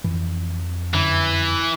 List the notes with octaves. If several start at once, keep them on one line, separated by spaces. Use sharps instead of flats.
F2 E3
F#2 D3 E3 C#4